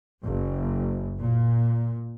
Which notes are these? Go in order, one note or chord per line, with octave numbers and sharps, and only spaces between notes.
F#1
A#2